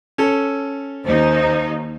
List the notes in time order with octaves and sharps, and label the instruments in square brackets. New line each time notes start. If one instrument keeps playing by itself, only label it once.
[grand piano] C#4 A4
[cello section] D#2 D#4 [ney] C5